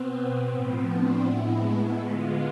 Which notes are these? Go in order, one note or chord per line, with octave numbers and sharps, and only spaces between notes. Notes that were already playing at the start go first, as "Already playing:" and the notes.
Already playing: B2 B3 C4
A2 F3 B3 C4
D4
A2 G#3 B3 E4
D3 G#3 B3 F4